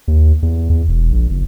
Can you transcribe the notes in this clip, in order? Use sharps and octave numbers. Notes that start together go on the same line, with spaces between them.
D#2
E2
E2
E1
A#1
F#1